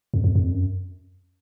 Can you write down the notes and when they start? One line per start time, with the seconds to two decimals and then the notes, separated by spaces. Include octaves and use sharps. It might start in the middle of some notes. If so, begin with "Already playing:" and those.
0.14 F2
0.24 F2
0.35 F2
0.51 F#2